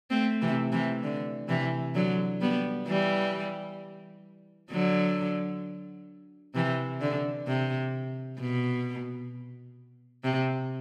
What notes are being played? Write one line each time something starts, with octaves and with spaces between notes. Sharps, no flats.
A3 C4
C3 E3
C3 E3
D3
C3 E3
D3 F#3
G3 B3
E3 G3
D3 F#3
C3 E3
D3
C3
B2
C3